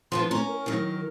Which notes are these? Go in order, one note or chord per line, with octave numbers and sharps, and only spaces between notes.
F3 B3 D4 C6
C#4 A#5
A#4
D#3 F#3